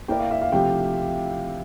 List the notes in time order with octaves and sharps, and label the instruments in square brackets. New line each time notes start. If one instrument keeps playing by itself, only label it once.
[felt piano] A#3 E4 A#4 D5 [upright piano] G5
[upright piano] F5
E5
F5
[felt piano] C3 F3 A3 E4 G4 [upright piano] G5